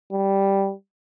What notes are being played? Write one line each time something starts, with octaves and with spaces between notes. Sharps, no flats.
G3